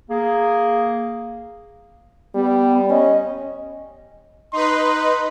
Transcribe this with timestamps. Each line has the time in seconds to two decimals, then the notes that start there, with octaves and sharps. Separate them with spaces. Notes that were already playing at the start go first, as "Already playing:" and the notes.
0.09 A#3 G#4
2.35 G3 B3
2.90 C#4 D#5
4.53 D#4 B4 C6